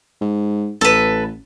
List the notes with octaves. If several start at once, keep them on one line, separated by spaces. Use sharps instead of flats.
G#2
A1 A4 B4